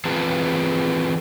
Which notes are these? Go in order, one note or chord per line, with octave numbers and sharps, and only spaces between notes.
E3 C4 F4 G#4 B4 A5